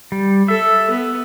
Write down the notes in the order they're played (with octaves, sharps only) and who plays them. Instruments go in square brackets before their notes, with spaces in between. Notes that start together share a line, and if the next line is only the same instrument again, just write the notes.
[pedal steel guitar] G3
[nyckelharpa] A4 [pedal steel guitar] E5
[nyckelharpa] B3